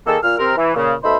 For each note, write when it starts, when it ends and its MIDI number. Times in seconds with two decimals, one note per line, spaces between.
0.07 0.18 51
0.07 0.18 58
0.07 0.18 68
0.07 0.18 69
0.23 0.38 46
0.23 0.38 89
0.39 0.55 48
0.39 0.55 60
0.39 0.55 70
0.57 0.74 52
0.75 0.93 46
0.75 0.93 49
1.04 1.17 47
1.04 1.17 57
1.04 1.17 63
1.04 1.17 72
1.04 1.17 76
1.04 1.17 83